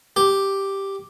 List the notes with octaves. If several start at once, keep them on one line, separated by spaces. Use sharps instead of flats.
G4